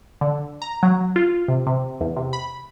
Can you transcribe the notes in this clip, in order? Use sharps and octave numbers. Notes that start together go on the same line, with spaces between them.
D3
A#5
F#3
F4
C3
C3
E2
C3
B5